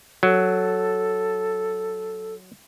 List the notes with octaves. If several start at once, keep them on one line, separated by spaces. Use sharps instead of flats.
F#3 A4